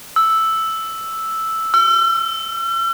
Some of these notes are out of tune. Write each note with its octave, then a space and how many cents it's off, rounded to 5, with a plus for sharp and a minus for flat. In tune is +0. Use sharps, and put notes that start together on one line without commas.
E6 -5
E6 +45